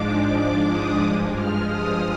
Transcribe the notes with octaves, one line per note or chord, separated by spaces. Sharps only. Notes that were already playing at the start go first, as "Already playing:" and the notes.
Already playing: G#2 F3 G#3 D4 D6
D#6
G2 F3 G#3
F6
D#6